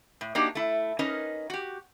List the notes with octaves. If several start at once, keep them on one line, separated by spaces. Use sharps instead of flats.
A2
A#3 D4 D#4 F#4 G4
A3 E4
C#4 D#4 A#4 B4 D#5
F#4 G4